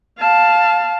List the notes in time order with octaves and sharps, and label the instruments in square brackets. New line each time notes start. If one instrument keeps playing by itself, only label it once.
[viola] F5 A5